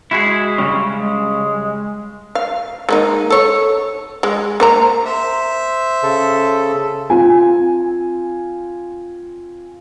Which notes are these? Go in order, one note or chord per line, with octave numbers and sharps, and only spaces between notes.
G#3 E4 F#4 G#4
C#3 G3 C#4
G#3
F5
G#3 A#3 D#4
A4 C#5
G#3
A#3 C5 A#5
C5 E5
C#3 A4
C4 F4 G#5